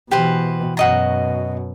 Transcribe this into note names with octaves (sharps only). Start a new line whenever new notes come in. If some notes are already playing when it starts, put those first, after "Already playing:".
B2 E3 G4 B4 C5
F#2 B2 F#4 D#5 A#5